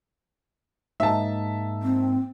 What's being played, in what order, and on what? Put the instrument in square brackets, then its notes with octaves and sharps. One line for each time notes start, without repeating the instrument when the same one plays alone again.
[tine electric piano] G#2 A#3 D#4 [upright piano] E5 A5
[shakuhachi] C4